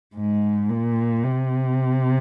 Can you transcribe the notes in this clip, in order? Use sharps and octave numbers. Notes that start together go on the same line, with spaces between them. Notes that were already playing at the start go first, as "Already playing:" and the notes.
G#2
A#2
C3